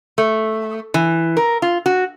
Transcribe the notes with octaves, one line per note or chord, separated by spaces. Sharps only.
A3
E3
A#4
F4
F#4